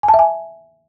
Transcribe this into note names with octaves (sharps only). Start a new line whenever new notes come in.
G#5
A5
E5
G#5